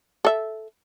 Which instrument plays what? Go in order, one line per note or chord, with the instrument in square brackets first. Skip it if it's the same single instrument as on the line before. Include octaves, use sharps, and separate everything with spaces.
[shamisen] A4 E5